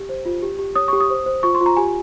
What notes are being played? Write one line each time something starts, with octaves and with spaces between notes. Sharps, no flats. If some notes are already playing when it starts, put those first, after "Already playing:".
Already playing: G4
C5
F4
G4
G4
C#5 D#6
G4 C#6
D#6
C5
C5
F4 C#6
C6
F4
A#5
G4 G#5